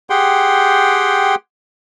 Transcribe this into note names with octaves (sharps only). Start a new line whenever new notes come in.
G4 G#4 F#5 G5 C6